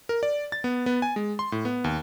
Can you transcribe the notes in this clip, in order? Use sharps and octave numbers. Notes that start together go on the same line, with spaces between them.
A#4
D5
A6
B3
B3
G#5
G#3
C6
A2
B3
D#2